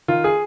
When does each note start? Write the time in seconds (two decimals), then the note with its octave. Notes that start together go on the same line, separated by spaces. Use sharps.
0.08 D#3 F4
0.24 G#4